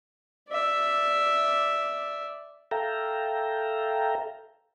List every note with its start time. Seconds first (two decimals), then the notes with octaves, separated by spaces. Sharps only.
0.49 D5 E5
2.71 A4 E5 F5 G5 A#5